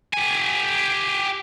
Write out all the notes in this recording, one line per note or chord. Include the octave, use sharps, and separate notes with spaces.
G4 G#5